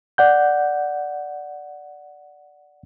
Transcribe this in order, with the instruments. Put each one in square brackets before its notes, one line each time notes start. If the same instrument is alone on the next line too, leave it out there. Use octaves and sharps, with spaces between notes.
[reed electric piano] D5 F#5 G6